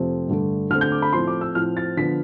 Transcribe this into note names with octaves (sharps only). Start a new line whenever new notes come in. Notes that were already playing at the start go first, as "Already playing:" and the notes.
Already playing: F2 C3 F3 A3 C4
G2 D3 A3
D3 A3 C4 F6
G6
D6
B5
A2 F3 A3 C4 C6
D6
E6
A2 F3 C4 F6
A6
D3 F3 B3 B6